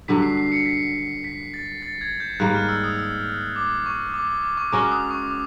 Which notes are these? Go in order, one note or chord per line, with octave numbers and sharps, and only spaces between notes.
G2 D3 F#3 B6
C7
C7
C#7
B6
B6
A6
A6
G#6
G6
G#2 D#3 G3 A#3 F#6
F6
E6
D#6
E6
D6
C#6
D6
D6
D6
C#6
G#3 C#4 F#4 A#4 D6
D#6
C#6
D6